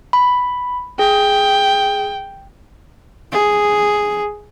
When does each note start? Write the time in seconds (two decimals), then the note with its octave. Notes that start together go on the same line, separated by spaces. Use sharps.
0.13 B5
0.99 G#4 G5
3.32 G#4